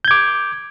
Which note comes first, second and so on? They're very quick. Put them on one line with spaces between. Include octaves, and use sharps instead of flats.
G6 G#6 D6